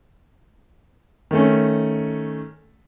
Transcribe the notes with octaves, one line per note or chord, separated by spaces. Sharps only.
D#3 A3 C#4